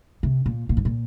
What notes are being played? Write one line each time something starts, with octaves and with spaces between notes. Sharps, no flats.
C3
A#2
A#2
G#2
A#2